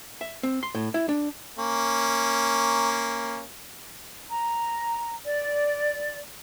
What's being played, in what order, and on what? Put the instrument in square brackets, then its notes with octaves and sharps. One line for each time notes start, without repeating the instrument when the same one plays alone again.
[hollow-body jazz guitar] E5
C4
C6
A2
E4
D4
[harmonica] A#3 C#4
[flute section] A#5
D5